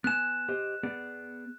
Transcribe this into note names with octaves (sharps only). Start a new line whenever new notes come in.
B3 G#5 F#6 E7
G4 C5 D#5
B3 G#4 D5